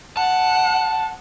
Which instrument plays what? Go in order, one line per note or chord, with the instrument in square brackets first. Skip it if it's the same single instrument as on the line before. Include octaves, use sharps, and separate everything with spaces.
[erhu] F#5 [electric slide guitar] A5